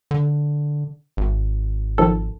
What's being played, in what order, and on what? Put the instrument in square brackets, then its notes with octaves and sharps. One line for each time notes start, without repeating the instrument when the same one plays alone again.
[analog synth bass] D3
G#1
[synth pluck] D#3 F3 A4